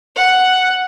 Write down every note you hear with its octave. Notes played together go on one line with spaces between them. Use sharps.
F#5